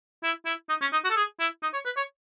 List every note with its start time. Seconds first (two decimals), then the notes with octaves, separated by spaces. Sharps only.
0.23 E4
0.46 E4
0.69 D#4
0.81 C#4
0.92 D#4
1.04 F#4
1.10 A4
1.16 G#4
1.40 E4
1.63 D#4
1.73 C#5
1.85 B4
1.97 C#5